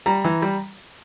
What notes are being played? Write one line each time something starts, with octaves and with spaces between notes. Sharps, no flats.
G3 A#5
E3
G3